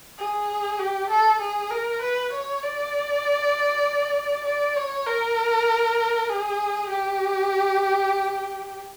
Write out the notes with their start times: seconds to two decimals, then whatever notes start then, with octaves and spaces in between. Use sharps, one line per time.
0.19 G#4
0.79 G4
1.10 A4
1.41 G#4
1.70 A#4
2.02 B4
2.33 C#5
2.63 D5
4.45 D5
4.76 C#5
5.06 A#4
6.29 G#4
6.90 G4